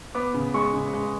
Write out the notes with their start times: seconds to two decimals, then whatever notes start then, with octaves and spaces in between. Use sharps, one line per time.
0.15 B3 D6
0.34 C#3
0.54 G#3 C#6
0.74 C#3
0.94 G#3